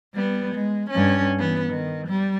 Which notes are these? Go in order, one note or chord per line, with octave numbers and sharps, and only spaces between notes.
G3 B3
G#3
G2 C#4
E3 B3
D#3
G3